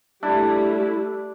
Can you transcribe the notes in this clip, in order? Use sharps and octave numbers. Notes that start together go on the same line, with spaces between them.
G3 A3 D4 E4